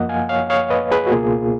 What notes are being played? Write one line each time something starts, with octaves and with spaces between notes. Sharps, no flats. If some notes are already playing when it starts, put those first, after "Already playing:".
Already playing: F#2 F3 A#3 D#5 F#5
F5 G#5
C#5 F5
C#5 F5
B4 D#5
G#4 B4
F#4
C#2 B2 A#3 F4 G#4